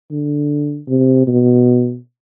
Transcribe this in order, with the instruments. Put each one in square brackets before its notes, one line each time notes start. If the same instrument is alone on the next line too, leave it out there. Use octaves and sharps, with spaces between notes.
[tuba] D3
C3
B2